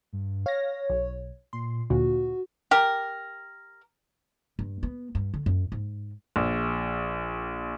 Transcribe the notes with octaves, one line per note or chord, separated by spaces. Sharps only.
G2
C#5 F5 A#6
B1
A#2 C6
D2 A#2 D3 F#4
G4 A#4
G2
B3
G2
D3
F#2
G#2
A#1